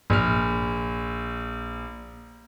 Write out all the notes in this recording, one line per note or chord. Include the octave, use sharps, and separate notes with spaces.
A#1 F6